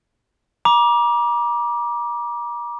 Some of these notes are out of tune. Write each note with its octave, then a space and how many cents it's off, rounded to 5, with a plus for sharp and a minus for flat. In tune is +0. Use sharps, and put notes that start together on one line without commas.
A#5 +40 D6 +0